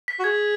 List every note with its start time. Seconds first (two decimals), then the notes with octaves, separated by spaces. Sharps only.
0.08 B6
0.19 F#4
0.24 G#4 G#6